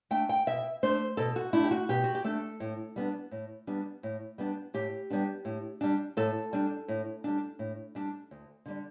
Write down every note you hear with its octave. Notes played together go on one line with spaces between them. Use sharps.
A3 D4 G5
G5
B2 E5
A3 D4 C5
B2 A4
F#4
A3 D4 E4
G4
F#4
B2 G4
F#4
G4
A3 D4 A4
A2
G3 B3 D4
A2
G3 B3 D4
A2
G3 B3 D4
A2 G4
G3 B3 D4
A2
G3 D4
A2 A4
G3 D4
A2
G3 D4
A2
G3 D4
D2
D3 G3 D4